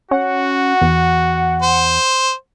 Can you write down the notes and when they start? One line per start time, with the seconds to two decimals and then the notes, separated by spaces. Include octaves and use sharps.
0.11 C#4 F#4 F#5
0.81 E2
1.62 C5